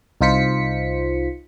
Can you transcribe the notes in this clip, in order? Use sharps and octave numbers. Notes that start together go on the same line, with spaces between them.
C2 D#4 F4 C5 B6 C#7